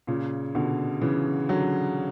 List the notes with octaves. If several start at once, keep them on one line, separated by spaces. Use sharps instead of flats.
A#2 C#3
B2 D3
C#3 E3
D3 F#3